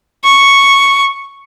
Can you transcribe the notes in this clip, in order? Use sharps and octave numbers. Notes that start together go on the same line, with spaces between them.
C#6